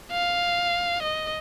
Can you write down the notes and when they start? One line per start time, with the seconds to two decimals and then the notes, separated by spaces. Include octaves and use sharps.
0.12 F5
1.03 D#5